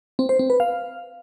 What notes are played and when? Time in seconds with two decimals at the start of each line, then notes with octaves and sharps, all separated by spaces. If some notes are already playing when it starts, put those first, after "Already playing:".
0.19 C4
0.29 C5
0.39 C4
0.50 B4
0.60 F5